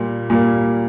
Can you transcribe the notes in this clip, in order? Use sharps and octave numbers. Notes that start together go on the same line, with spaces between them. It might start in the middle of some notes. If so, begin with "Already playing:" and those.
Already playing: A#2 G3 A#3
A#2 G3 A#3